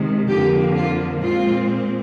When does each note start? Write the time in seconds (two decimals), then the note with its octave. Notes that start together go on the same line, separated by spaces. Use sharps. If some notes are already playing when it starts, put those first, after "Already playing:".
Already playing: C3 D#3 G#3
0.28 F2 D3 F3 A#3 G4
0.75 F4
1.22 A#2 G#3 C4 F4